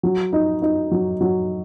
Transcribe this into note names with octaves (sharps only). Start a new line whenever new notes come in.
F#3
D#4
D#4
F#3
F#3